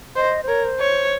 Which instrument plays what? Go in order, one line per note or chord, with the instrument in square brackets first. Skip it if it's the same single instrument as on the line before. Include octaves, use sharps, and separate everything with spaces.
[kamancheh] C5 [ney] D#5
[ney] C5
[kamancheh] A#4 [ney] C#5
[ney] C5
[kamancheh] C#5